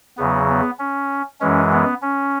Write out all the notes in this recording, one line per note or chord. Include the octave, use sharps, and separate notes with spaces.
E2 C#3 F#3 B3
B3
C#4
F#2 E3 G#3 C#4
B3
C#4